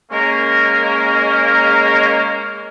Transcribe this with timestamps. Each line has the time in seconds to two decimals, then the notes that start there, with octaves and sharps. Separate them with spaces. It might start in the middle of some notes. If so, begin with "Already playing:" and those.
0.12 G#3 A#3 C#4 A#4